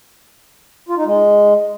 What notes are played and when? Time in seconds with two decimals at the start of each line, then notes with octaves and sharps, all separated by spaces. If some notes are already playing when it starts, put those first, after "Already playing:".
0.89 F4
0.97 D#4
1.05 G#3